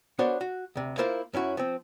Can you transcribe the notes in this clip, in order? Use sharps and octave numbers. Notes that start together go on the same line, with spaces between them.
B3 D4 F#4 A#4 C5 C#5
F#4
D2 C3
A#3 E4 F4 A#4 C5 F5
F#2 C#4 E4 F#4
F3 C4